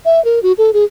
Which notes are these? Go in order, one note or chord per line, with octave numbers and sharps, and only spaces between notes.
E5
A#4
F#4
A4
G#4